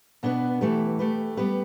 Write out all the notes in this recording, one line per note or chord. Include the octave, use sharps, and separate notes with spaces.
B2 B3 D4 B4
E3 A3 G4 B4
A3 G4 B4
G3 B3 G4 B4